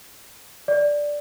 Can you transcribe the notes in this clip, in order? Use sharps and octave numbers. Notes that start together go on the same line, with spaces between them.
D5